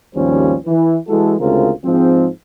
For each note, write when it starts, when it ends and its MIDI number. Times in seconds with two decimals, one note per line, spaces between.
0.15 0.56 32
0.15 0.56 39
0.15 0.56 53
0.15 0.56 55
0.15 0.56 61
0.15 0.56 72
0.66 0.96 52
1.08 1.34 52
1.08 1.34 56
1.08 1.34 64
1.08 1.34 66
1.08 1.34 69
1.40 1.71 38
1.40 1.71 49
1.40 1.71 56
1.40 1.71 60
1.40 1.71 65
1.40 1.71 70
1.85 2.28 44
1.85 2.28 53
1.85 2.28 56
1.85 2.28 60